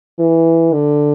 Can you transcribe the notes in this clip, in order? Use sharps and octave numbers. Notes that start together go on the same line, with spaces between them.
E3
D3